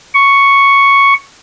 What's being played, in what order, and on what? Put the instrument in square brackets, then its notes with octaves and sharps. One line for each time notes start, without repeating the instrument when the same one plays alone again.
[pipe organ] C#6